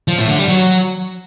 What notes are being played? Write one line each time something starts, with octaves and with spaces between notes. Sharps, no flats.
F3
A2
D3
G3
F#3